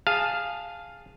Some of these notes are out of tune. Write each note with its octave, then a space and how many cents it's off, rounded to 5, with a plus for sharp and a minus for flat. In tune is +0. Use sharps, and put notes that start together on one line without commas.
G#4 -15 F5 +0 A5 +0